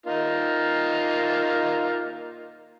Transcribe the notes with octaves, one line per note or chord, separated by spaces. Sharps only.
A#3 D#4 F4